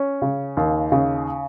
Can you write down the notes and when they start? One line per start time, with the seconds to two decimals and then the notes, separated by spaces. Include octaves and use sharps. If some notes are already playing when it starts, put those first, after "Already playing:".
Already playing: C#4
0.22 C#3
0.57 D#2
0.92 C#3